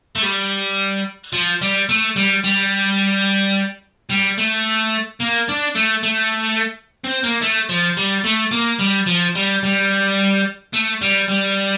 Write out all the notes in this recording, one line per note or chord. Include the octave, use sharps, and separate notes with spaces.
A3
G3
F3
G3
A3
G3
G3
G3
A3
A#3
D4
A3
A3
C4
A#3
A3
F3
G3
A3
A#3
G3
F3
G3
G3
A3
G3
G3